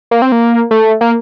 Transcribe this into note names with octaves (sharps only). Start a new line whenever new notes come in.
A#3
C4
A#3
A3
A#3